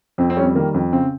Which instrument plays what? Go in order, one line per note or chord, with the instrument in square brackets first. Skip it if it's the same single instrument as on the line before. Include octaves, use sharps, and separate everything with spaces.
[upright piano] F2 C4
C4
G3 C#4
C4
D#3 A#3
F2
C#3 C4